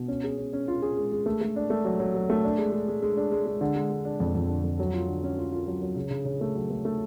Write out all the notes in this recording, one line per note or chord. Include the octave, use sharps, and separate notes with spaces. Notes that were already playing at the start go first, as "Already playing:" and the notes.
Already playing: B2
C#4
G#4
C#4
C#4
F4
G#4
G#3
G#3
A3
A3
D4
A3
F#3
F#3
F#3
A3
D4
G#3
G#3
G#3
G#3
D4
G#3
G#3
D3
G#3
G#3
D4
F2
F2
D3
F2
F#3
F4
D3
C#4
F4
F4
F#3
F#3
C#3
C#3
C#3
A3
F#3
A3
A3